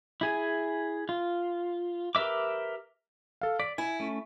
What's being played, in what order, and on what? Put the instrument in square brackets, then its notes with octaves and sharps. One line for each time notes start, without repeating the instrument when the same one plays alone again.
[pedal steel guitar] E4 G#4 G#5
F4
G4 A#4 B4 E5 D6
[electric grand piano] A4 F5
[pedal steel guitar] D5 [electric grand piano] B6
[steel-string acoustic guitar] E4 [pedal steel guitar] G#5
[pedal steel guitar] A3 C#4